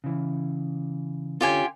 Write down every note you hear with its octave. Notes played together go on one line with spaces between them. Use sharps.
C#3 E3
D3 C#4 F4 G4 A4 G#5